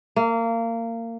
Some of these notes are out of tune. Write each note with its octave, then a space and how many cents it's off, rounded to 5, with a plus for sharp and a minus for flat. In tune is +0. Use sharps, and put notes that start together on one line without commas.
A#3 -25